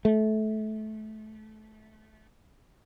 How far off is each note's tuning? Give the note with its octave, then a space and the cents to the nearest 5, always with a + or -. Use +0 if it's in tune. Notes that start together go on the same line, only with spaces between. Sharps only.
A3 -25